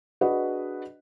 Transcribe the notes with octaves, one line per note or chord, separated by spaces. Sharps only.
D4 F#4 G#4 B4 D#5 F#5